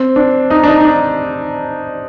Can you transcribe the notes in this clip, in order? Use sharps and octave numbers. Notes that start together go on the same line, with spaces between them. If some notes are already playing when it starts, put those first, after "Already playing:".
Already playing: C4
D4
D#4
D4
D#4
D#4
D4